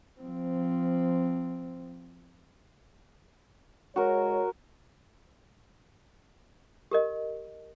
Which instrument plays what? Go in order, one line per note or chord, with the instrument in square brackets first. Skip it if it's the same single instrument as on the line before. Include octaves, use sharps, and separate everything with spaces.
[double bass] F3 C4
[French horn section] G#3 C#5 [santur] F#4 A#4
[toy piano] G4 A#4 D#5